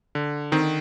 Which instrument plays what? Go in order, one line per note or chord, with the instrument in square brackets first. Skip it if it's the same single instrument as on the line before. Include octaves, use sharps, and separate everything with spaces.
[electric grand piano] D3
D#3 C4 D#4